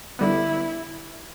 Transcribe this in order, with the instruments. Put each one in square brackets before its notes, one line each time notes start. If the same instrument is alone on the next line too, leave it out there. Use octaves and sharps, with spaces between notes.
[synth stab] D3 G3 B3 [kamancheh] E4